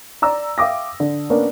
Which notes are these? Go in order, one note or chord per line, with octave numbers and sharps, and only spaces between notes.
D5 A#5 E6
E5 F5 G5 D6 D#6 A#6
D3
A#3 B3 C#4 D4 A#4